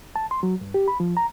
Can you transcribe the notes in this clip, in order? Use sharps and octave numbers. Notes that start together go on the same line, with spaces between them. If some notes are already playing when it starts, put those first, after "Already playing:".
A5
C6
F#3
G2
G4
B5
F3
A#5